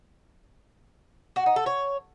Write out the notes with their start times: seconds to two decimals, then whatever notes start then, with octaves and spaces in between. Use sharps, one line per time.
1.36 F#4
1.46 D#4
1.56 A4
1.66 C#5